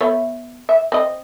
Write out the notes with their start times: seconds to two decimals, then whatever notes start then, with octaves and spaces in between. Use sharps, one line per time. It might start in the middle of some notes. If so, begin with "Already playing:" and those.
0.01 A3 B3 C#5
0.69 E5
0.92 C4 D#5